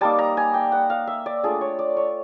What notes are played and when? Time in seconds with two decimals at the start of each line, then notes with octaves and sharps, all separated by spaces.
0.01 G3 A#3 D#4 A5
0.19 A#5
0.37 G#5
0.54 G5
0.72 F#5
0.90 F5
1.07 E5
1.26 D5
1.43 A3 D4 F4 G#4
1.61 C#5
1.79 D5
1.97 C#5